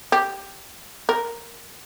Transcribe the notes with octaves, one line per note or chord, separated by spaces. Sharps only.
G4
A#4